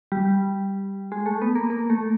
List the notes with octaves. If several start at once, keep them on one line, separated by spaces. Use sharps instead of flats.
G3
G#3
A3
B3
A#3
A#3
A3